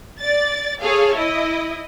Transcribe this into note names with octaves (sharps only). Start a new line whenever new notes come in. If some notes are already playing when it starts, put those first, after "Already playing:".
D5 A6
G#4 A4 C#5 F5
E4 D#5